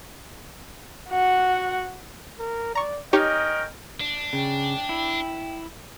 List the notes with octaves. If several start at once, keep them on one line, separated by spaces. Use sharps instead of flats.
F#4 F#5
A#4
D5 A#5 C#6
C#4 D#4 G4 A#4 C#5 D#5 G5
D4
C#3 G5
E4